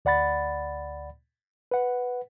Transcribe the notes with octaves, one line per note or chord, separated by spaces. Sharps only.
D2 D5 F#5 B5 A6
B4 F#5